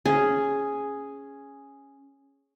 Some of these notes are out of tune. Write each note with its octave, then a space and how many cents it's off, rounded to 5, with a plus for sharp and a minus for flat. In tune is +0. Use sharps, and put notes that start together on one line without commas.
C#4 +0 G#4 +0